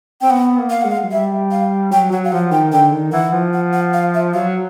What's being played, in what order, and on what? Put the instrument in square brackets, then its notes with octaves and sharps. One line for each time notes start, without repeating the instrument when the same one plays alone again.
[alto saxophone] C4 [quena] G5
[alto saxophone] B3 [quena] F#5
[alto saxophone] A#3
[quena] F5
[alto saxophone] G#3 [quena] F#5
[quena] F5
[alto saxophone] F#3
[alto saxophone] G3 [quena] E5
[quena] F5
[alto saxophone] F#3 [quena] G5
[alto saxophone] F#3 [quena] F#5
[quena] F5
[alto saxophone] F3 [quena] F#5
[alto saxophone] D#3 [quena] G5
[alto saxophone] D3 [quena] G5
[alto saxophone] D#3
[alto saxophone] E3 [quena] F#5
[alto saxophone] F3
[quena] F#5
F#5
F5
E5
[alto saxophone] F#3 [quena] F5